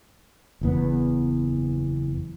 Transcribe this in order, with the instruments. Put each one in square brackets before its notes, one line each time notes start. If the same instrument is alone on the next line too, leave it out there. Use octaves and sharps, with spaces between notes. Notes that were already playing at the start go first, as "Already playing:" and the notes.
[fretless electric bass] F#1 E2 B3